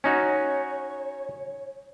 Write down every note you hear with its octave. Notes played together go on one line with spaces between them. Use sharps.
C#4 D#4 F#4 C#5